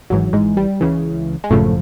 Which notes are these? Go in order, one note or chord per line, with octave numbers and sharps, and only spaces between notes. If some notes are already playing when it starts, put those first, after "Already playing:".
G#1 G#2 E3 F#3
G#2 G#3
G3
C#2 C#3 E3
G#3
G#1 F#2 A2 C#3 F3 A3